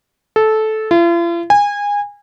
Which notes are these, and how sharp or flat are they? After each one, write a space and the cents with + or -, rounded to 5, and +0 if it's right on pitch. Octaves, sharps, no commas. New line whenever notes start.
A4 -15
F4 -45
G#5 -25